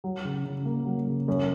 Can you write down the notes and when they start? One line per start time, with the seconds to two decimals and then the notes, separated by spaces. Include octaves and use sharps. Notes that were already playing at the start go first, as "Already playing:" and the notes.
0.04 F#3
0.25 C#3
0.45 C#3
0.65 A#3
0.86 F#3
1.07 C#3
1.28 F#2